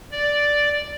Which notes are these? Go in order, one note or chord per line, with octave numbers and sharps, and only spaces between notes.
D5